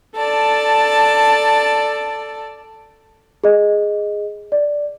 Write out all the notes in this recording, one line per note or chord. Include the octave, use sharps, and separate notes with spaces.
A4 D5 A5
G#4 D#5
D5